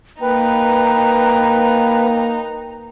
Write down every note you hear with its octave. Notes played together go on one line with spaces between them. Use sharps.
A#3 D#4 B4 G5 A#5